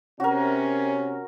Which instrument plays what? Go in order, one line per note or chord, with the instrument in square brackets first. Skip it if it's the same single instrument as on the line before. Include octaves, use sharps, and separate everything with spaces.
[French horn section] C3 C#4 [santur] F#4 A#4